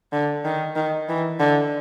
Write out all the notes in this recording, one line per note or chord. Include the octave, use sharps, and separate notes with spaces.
D3
D#3
D#3
E3
D3